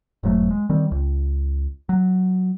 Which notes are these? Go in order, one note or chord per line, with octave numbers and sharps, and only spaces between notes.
E1 G#2 F#3 A3
G#3
D#3 G3 C4
C#2
F#3